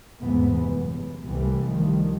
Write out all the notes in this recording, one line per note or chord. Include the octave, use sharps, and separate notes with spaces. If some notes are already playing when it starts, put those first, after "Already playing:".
F1 E2 G#2 C3 E3 B3
F#2
C2 C3 E3 G3 A3
D#3 F3 G3